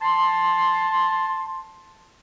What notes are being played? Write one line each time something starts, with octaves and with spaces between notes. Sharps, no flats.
A5 C6